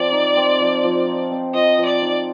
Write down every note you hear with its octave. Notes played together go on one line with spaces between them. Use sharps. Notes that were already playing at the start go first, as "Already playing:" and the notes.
Already playing: F3 C4 D5
D#4
C4
F3
F3
D#4
C4
F3 D#5
F3
D5
D#4